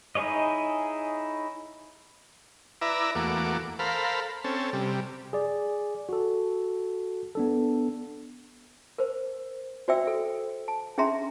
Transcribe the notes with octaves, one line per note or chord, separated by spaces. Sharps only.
D#4 E4 G#4 C#5 D#5
E4 B4 D5 E5 A#5
E2 A3 A#3 F#4 D6
A4 A#4 C5 F5 B5
C4 C#4 A4
C3 G3
G#4 D5
F#4 A4
B3 D4 A4
A#4 C5
F#4 C5 D5 E5 G5 E6
A4
A5
C#4 D4 G#4 E5 A#5 C6